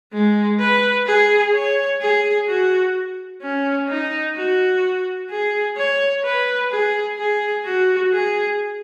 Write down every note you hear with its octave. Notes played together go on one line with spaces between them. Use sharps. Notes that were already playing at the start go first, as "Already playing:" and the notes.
G#3
B4
G#4
C#5
G#4
F#4
C#4
D#4
F#4
G#4
C#5
B4
G#4
G#4
F#4
G#4